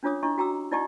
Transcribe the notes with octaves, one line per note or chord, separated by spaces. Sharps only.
C#4 D4 F4 C#5 D6 D#6
D4 E4 D#5 C#6
F#4 G5 A#5 D6 E6
D#4 E4 D5 D#5 G5 C#6